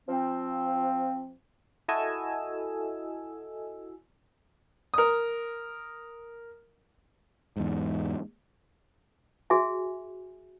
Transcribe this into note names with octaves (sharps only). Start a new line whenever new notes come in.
F3 C4
E4 F#4 A4 D#5 G#5 E6
A#4 D#6
E2 G#2
F#4 G#4 E5 G#5